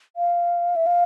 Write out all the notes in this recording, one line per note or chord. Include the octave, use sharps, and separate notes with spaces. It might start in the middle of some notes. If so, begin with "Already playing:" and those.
F5
E5
F5